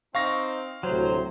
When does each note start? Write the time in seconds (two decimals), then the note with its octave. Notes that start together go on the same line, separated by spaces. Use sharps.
0.15 C4 D#4 F5 C#6 A#6
0.83 D2 A2 C3 F#3 C5